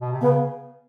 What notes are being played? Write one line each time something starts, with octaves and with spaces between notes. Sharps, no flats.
B2
C3
C#3 B3